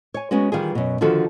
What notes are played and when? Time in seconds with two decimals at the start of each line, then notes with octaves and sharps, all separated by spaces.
0.14 C#5 G#5
0.31 G#3 B3 C#4 F#4
0.52 D#3 E3 G3 F4 G#4
0.75 F#2 B2
1.01 D3 D#3 F3 F#4 A4